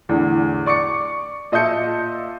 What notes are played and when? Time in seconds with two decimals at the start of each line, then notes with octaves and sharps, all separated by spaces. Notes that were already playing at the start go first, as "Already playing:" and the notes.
0.09 E2 A2 D3
0.66 D5 C#6 D6 C#7
1.52 A#2 D#5 E5 A5 G6 C#7